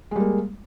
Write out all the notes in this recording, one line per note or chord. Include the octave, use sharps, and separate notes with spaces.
G3 G#3 A#3